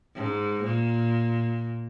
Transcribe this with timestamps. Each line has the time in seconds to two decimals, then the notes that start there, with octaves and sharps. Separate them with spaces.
0.15 G#2
0.64 A#2